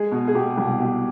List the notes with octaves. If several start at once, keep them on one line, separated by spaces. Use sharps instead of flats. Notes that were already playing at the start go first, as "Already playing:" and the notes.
Already playing: G#3 G#4
B2
G#4
B2 G4
C2
B2 G4